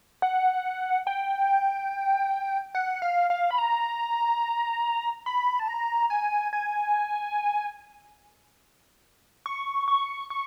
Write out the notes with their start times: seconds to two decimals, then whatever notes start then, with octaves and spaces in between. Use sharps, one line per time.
0.22 F#5
1.07 G5
2.75 F#5
3.02 F5
3.30 F5
3.51 B5
3.58 A#5
5.26 B5
5.59 A5
5.68 A#5
6.10 G#5
6.53 G#5
9.46 C#6
9.88 C#6
10.30 C#6